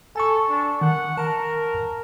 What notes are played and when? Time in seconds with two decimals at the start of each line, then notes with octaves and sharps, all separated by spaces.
0.16 A4 G#5 C#6
0.49 D4
0.81 D#3 F#5
1.18 A#4 A5